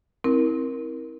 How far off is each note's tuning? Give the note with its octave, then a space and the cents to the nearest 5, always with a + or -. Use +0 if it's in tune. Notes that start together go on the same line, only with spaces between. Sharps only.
C4 +15 E4 -30 A#4 +10